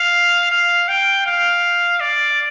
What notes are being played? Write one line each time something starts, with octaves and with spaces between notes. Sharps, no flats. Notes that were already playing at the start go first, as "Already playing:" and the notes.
Already playing: F5
F5
G5
F5
D5